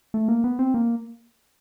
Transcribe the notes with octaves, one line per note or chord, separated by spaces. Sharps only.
A3
A#3
B3
C4
A#3